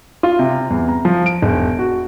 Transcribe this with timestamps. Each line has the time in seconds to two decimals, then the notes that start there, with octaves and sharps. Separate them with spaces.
0.23 F4
0.39 C3
0.70 E2
0.88 A#5
1.05 F3
1.26 D7
1.42 E1
1.79 F#4